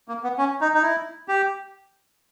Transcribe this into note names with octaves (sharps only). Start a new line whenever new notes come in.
A#3
B3
C#4
D#4
D#4
E4
G4